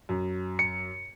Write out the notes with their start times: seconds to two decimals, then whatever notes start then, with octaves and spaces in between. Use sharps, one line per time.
0.09 F#2
0.59 C#7